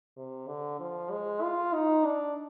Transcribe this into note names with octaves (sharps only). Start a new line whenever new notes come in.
C3
D3
F3
G#3
F4
D#4
D4